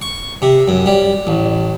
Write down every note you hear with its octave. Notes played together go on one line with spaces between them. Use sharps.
C#6
C3
F#2
G3
A1